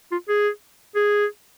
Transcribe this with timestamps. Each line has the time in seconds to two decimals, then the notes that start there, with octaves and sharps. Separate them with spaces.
0.12 F4
0.28 G#4
0.95 G#4